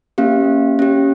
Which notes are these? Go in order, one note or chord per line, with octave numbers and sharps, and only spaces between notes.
A#3 C#4 G4 F5
C#4 G4